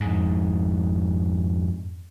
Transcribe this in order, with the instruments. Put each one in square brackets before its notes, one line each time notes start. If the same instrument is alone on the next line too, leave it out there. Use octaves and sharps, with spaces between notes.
[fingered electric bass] F2 G#2